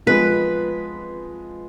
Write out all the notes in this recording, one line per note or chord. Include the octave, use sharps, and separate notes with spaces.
F3 G#3 B3 B4